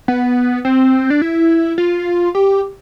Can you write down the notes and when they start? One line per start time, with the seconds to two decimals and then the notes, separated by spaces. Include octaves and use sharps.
0.08 B3
0.65 C4
1.10 D4
1.22 E4
1.78 F4
2.35 G4